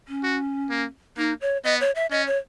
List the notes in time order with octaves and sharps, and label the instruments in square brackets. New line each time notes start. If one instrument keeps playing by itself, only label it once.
[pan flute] C#4
[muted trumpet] F#4
A#3
[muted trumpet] A#3 [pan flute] D#4
[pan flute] C#5
[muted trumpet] B3 [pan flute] D#5
[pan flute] C#5
E5
[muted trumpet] C#4 [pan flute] D#5
[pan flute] C#5